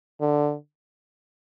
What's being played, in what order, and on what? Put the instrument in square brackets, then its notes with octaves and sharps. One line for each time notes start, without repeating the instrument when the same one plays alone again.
[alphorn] D3